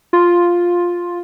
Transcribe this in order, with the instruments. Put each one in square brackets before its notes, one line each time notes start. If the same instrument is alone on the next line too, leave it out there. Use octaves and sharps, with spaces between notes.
[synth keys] F4